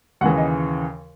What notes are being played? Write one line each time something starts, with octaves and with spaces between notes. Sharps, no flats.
D#2 C#3 E3 F#5
D#5